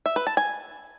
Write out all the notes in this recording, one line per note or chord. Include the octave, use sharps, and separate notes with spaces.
E5
B4
A5
G#5